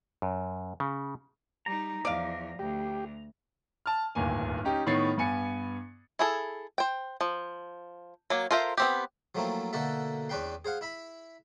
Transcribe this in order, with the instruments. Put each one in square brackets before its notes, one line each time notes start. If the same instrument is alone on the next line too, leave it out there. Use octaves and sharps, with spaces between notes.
[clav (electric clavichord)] F#2
C#3
[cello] G3 D#4 [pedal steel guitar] A#5
[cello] E2 F3 [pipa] D5 D#5 F5
[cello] D2 [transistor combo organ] G4
[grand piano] A5 F6
D1 G1 D#2 A#3 G#5
C#4 D#4 G4
A2 D#3 B3 C#5 A6 C7
G2 B3 G#5 C#7
[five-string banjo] E4 G#4 A4
C5 G5
F3
F#3 A#3
F4 A4 A#4 C5 E5
B3 C4 G4
[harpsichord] F3 F#3 A3 A#3 C4 E4
B2 D3 A#3 F#4 A4 E5
E2 C#4 D4 B4 G5 C6
G#4 C5 F5 F#5
E4 E5 B5